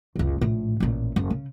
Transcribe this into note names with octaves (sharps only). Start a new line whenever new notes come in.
F#1 C#2
A#1 A2
A1 A#2
F#1
C#3